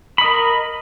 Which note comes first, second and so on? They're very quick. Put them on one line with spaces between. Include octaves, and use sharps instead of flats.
B5 D#5 A#4